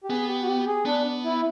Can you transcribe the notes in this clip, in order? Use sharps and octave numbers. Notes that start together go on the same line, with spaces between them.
G4
B3 G#4
G4
F#4
G4
G#4
B3 D4
E4